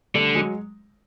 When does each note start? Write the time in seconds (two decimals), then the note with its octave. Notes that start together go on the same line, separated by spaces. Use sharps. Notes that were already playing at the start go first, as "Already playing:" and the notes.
0.14 D3 G3 A3
0.35 F#3 G#3